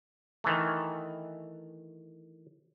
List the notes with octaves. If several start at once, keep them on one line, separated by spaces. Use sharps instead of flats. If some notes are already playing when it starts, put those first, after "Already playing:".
D#3 E3 A3